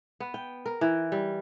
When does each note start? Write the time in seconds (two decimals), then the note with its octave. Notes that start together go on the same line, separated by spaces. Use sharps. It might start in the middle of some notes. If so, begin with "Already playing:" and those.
0.20 B3
0.34 G5
0.66 A#4
0.81 E3
1.12 G3